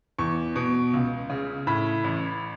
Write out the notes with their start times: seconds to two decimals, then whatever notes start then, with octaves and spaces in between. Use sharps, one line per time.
0.19 E2 C#6
0.56 B2
0.93 C#2
1.30 C#3
1.67 A2 B5
2.04 A1